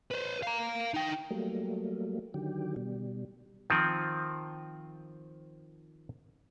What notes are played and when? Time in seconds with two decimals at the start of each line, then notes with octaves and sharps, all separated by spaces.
0.11 B4 C5
0.43 F5 A#5
0.94 D#4 G5
1.31 F#3 G3 A3 A#3
2.34 D3 D#3 F#3 G4
2.76 B2 G3
3.70 D#3 F3 C4